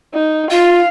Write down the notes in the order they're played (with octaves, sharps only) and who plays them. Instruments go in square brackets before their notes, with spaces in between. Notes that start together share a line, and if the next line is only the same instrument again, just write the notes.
[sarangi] D#4
[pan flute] F4 [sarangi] F5